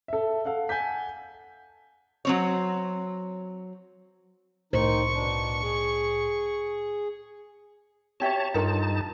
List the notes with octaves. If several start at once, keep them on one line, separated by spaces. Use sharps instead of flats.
A4 E5
A4 F5 F#5
F#5 G#5 A5 G6 B6
F#3 C4 C#5
C2 A2 D#3 D#4 C5 C#6
B2 D4
G#4
F#4 G4 C#5 E5 A5
G2 D#4 F4 A4 A#4 A5